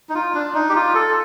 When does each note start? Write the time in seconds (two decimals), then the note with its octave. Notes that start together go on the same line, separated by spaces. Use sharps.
0.09 D#4
0.15 F4
0.35 D4
0.55 D#4
0.69 G4
0.75 F4
0.95 A4